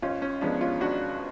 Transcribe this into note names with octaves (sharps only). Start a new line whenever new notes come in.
G#1 C#4 F4
C#4
G#2 F3 G#3 B3 D4
C#4 F4
G#1 D4 F#4